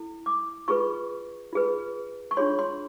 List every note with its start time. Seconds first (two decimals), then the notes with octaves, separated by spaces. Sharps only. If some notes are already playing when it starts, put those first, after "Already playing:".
Already playing: E4 A4
0.26 D6
0.68 F4 G#4 B4 C#6
1.53 F4 G#4 B4
2.31 C#6
2.37 D4 F4 G#4 C#5 C6
2.59 C6